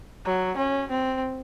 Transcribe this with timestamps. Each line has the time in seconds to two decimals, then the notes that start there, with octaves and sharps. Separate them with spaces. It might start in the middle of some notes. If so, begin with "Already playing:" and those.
0.25 F#3
0.57 C#4
0.90 C4